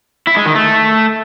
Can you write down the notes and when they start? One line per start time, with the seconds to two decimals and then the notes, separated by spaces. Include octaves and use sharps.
0.27 E4
0.36 G#3
0.46 D#3
0.55 A3